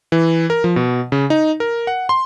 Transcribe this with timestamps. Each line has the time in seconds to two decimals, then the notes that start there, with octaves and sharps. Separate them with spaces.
0.12 E3
0.50 A#4
0.64 F3
0.76 B2
1.12 C#3
1.30 D#4
1.60 A#4
1.87 F#5
2.09 C6